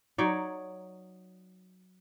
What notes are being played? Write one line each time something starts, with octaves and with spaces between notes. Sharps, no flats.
F#3 D#4 C#5 D5